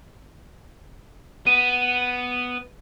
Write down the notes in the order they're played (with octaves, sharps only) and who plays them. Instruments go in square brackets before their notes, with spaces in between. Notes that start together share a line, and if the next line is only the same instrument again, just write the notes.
[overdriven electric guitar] B3 [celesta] D#7